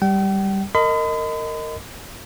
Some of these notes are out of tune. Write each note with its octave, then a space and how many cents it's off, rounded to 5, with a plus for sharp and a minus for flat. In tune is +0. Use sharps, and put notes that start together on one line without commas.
G3 +0 G5 -40
A#4 -25 D#5 +0 B5 +45